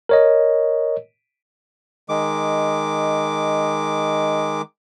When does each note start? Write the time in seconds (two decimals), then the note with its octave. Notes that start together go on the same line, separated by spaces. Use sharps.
0.09 A#4 C#5 D#5
2.09 D#3 G#3 D6